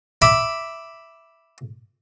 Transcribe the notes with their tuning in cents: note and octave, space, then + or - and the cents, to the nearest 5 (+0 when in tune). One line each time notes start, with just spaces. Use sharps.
E5 +0 B5 +0 D6 +0